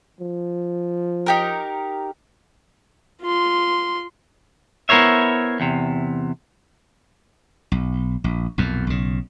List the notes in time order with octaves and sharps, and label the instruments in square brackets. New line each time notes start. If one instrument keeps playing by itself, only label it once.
[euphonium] F3
[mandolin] D#4 G4 A#4
[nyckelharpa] F4 C6
[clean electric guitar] B3 E4 A#4 C5 C#5 E5
E2 C3
[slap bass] B1
A#1
B1 F2 A#2
B1 C#3